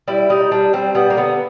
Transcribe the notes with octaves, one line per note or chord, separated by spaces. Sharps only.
G3 E4
G3 D#4
G3 D4
G3 C4
G3 B3
A#3
D3 B3